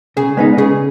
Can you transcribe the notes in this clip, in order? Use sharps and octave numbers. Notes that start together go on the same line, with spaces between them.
C#3 G#4
G#3 B3 D#4
C#3 G#4